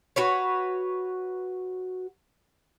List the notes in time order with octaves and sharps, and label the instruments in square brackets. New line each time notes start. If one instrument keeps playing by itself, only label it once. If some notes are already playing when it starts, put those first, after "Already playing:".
[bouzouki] F#4 B4 C#5